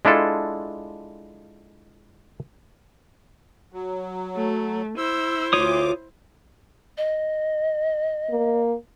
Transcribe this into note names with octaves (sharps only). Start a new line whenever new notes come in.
G#3 D4 E4 F4 A4
F#3
A3
E4 C5 E6
D2 F4 C#5 D6 D#6
D#5
A#3